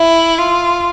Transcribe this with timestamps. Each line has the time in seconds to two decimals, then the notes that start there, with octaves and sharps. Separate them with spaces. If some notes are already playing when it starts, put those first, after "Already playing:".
Already playing: E4 E5
0.38 F4